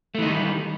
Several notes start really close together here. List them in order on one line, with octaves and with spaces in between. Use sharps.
A3 E3 D#4 D#3 G3